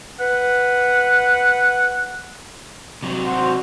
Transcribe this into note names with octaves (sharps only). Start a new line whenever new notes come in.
B4 F#5
C3 F#3
F#4 C5